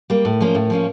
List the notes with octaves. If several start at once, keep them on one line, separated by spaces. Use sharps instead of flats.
G3 A#3
A2
F3 A#3 C#4 F4
A2
F3 A#3 C#4 F4